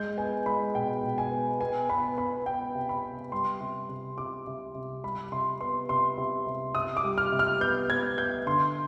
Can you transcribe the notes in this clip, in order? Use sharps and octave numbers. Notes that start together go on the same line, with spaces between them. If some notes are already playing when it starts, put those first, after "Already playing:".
Already playing: G#3 G6
B3 G#5
G#3 B5
B2 G5
B2
G#5
B3
B3 G#5
B3 B5
B3 B5
B3 G5
C3
B5
B3
G3 C6
C3
C3
C3 D6
C3
C3
G3 B5
C3 C6
B3 C6
C3 C6
C3
C3
C3 D#6
D6
G3
F6
C3
F6
B3 G6
B3 G#6
B3 G6
D3 C6